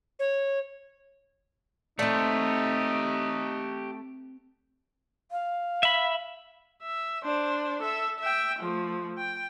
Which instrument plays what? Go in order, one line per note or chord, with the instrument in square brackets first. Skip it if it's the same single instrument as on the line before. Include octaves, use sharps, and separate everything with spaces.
[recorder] C#5
[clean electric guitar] A3 [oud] C4 D5 [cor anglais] D#4 [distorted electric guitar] G4 C#5
[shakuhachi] F5
[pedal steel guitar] E5 B5
[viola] E5
D4 C5
A4 E5
E5 G5
F3 A3
G5